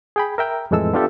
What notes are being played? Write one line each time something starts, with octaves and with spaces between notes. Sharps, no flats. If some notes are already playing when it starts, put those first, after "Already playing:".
G#4 G5 B5
A#4 E5 G5 A#5
F2 A2 E3 G#3 A4 E6
B3 D4 F4 G4 A4 E5